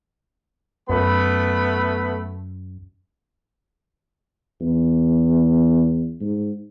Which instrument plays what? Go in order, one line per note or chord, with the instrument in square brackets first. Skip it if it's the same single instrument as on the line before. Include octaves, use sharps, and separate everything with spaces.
[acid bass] F#2 [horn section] A3 B3 B5
[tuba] E2
G#2